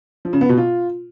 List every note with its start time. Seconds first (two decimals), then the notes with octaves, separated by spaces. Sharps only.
0.25 F3
0.33 C#3
0.41 B3
0.49 B2
0.57 F4